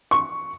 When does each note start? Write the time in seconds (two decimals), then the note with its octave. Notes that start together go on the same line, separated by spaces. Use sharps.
0.11 C#6